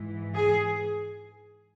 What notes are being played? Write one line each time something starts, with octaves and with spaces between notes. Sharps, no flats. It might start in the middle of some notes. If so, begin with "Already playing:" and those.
Already playing: G#2 E3
G#4